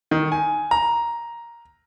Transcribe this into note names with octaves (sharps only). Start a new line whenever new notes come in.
D#3
G#5
A#5